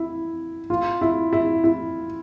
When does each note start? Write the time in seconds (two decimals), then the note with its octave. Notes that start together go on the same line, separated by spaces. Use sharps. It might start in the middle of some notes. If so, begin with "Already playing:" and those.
Already playing: E4
0.70 F4
1.01 E4
1.33 E4
1.64 E4